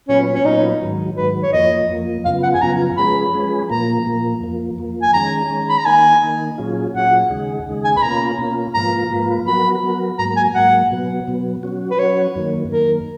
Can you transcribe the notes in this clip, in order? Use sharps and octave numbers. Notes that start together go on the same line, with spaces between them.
A#2 F#3 B3 C#4 F4 B4
C#4
A#2 F#3 B3 D#4 F4 B4
G#2 D#3 F#3
G#2 D#3 F#3 B4
C#5
F2 F3 A#3 D#5
F2 F3 A#3
F#2 C#3 F3 B3 F4 F5
F#5
G#5
F#2 C#3 F3 B3 F4 A#5
F3 G#3 C#4 G#4 B4 B5
F3 G#3 C#4 G#4 B4
A#2 F3 A#3 A#5
A#2 F3 A#3
F2 F3 A#3
F2 F3 A#3
G#5
D#3 G#3 C#4 A#5
D#3 G#3 C#4
B5
A#5
D#3 A#3 D#4 G#5
D#3 A#3 D#4
A#2 F#3 C#4 F4 G#4
A#2 F#3 C#4 F4 G#4 F#5
D#2 C#3 G#3 D#4 G#4
D#2 C#3 G#3 D#4 G#4
G#5
B5
B2 A#3 C#4 F4 A#5
B2 A#3 C#4 F4
G#2 F3 A#3 F4 B4 A#5
G#2 F3 A#3 F4 B4
F#3 B3 F#4 A#4 B5
F#3 B3 F#4 A#4
G#2 F#3 A#3 A#5
G#5
G#2 F#3 A#3 F#5
B2 F#3 B3
B2 F#3 B3
F#3 C#4 F#4
B4
F#3 C#4 F#4 C#5
F#2 D#3 A#3
F#2 D#3 A#3 A#4